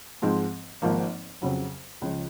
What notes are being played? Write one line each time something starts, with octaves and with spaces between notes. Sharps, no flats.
G#2 F3 G#3 C4
G#1 G#2 F3 A#3
F2 C#3 F#3
C#2 C#3 F3